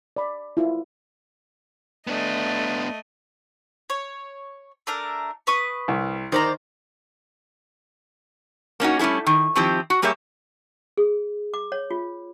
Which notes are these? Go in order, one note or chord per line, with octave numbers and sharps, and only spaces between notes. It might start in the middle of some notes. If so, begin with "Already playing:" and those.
D5 B5
E4 F4
A3 B3 D4 D#5
C#5
A3 D4 A#4
B4 C#6 D#6
C2
D#3 C5 D5 A#5
A#3 C#4 D#4 F#4
G3 A3 C#4 E4 G#4
D#3
D#3 F3 C4 E4 G4
F#4
G3 A#3 G4 G#4 C#5 E5
G#4
D6
C#5
F4